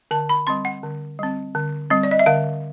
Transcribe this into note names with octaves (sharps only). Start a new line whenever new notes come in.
D3 A5
B5
G3 C4 C6
F#5
D3
G3 C4
D3
G3 C4
D5
D#5
E5
D3 F5